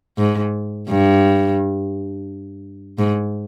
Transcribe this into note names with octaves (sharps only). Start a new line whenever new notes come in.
G#2
G2
G#2